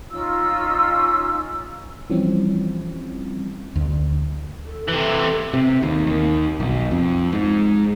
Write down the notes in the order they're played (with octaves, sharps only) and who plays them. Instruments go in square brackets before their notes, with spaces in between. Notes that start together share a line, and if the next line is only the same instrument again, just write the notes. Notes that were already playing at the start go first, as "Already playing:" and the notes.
[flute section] C#4 D#4 F4 E6
[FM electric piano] E3 F3 G3 C4 C#4
[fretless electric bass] D2
[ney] A4
[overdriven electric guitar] C3 E3 [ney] A4
[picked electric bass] C3
D#2
D#2
B1
F2
G#2